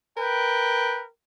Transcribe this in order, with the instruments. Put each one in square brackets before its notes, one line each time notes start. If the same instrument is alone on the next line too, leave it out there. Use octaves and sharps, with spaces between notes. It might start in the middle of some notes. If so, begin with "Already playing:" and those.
[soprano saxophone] A#4 [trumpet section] B4 G5